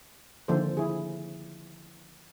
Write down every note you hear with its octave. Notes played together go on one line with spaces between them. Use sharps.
D3 D#3 F3 A#3 A4 C5
E4 G#4